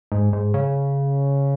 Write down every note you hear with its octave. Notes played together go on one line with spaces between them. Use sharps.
G#2
G#2
C#3